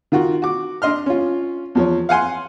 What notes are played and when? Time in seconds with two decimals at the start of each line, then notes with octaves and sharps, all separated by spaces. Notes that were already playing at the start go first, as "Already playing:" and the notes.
0.12 D#3 F4 F#4
0.42 F#4 D6
0.82 D4 D#5 C6 F6
1.06 C#4 F4
1.75 E2 F3 C#5
2.09 F5 F#5 G#5 C6